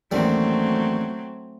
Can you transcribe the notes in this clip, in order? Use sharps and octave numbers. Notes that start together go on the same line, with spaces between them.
A1 D#2 F#3 G3 A3 C4